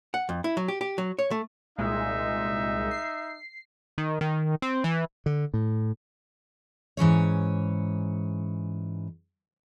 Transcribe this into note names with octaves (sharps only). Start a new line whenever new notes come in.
F#5
F2
E4
F#3
G4
G4
F#3
C#5
A3
C2 A#2 G#3 D#4 E5
C7
D#3
D#3
C4
E3
D3
A2
G#2 E3 C#4 C#5